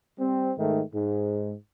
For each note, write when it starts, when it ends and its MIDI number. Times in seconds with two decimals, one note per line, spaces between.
0.18 0.52 55
0.18 0.52 60
0.56 0.80 44
0.56 0.80 51
0.56 0.80 57
0.93 1.54 44